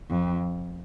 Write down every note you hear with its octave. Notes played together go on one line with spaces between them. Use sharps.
F2